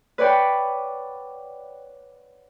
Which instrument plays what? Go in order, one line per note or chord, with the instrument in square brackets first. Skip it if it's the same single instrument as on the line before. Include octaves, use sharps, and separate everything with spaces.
[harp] B4 C#5 D5 F#5 G5 B5